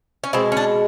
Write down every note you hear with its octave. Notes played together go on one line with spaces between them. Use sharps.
C#4
B2 G#3 C4
C#4
D4